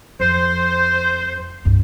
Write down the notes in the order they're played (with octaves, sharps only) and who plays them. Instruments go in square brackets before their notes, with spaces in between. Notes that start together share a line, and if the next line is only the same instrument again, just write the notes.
[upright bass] F2 [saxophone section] C5
[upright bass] C2 G2